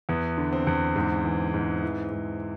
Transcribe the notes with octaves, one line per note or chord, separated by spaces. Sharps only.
E2 B3
D3
C4
E2
G#2
E3
G#2
E3
G#2